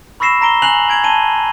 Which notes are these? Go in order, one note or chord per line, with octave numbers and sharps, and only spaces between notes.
B5 C#6 E6 A#6 C7 E7
A#5 A#6 D7 G7
G#5 F#6 C7 F7 F#7
G#5 G#6 D7 F#7
A5 D7 D#7 G7